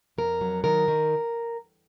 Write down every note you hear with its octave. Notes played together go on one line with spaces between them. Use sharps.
F2 A#4
F#3
D#3 A#4
D#3